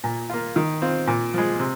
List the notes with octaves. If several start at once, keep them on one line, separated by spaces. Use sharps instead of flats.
A#2
A#3 F4
D#3
C4 F4
A#2
F3 G#3
C3